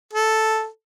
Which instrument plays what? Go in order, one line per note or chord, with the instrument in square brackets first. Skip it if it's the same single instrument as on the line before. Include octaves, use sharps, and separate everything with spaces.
[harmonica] A4